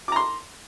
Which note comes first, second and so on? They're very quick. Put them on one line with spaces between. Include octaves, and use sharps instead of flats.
D6 A#5 C6